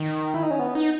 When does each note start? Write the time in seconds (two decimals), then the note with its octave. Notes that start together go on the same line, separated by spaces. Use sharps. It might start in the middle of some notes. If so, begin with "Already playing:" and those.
Already playing: D#3
0.34 E4
0.43 D#4
0.51 C#4
0.59 B3
0.75 D#4